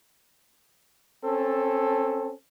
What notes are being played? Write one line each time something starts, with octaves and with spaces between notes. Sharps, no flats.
C4 C#4 A4